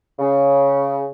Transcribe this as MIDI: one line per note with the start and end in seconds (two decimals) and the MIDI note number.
0.19 1.08 49